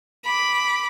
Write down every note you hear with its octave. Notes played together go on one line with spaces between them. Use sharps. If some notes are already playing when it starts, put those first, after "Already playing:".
B5 D6